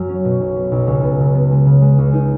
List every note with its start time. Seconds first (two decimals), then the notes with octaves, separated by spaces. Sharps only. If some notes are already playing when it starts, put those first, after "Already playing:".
Already playing: F#2 F#3
0.09 C#4
0.24 B2
0.40 B1
0.56 B3
0.72 B1
0.87 C#2
1.03 B3
1.19 C#3
1.35 B3
1.51 G#3
1.66 C#3
1.82 G#3
1.98 C#2
2.13 D#4